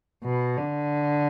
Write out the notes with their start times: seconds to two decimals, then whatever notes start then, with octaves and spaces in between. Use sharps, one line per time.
0.24 B2
0.57 D3